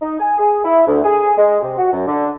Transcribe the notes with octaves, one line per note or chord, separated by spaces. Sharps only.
D#4
G#5
G#4
E4
D2
G#4
G#3
C3
F#4
F#2
D3